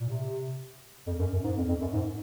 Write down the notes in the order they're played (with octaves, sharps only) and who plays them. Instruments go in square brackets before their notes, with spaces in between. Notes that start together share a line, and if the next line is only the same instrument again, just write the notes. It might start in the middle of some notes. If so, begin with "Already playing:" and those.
[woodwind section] A#2
C3
F2
F#2
F#2
G#2
F2
F2
F#2
G#2